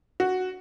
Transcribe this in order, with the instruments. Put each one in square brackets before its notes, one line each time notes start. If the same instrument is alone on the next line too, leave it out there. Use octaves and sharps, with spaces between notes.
[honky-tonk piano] F#4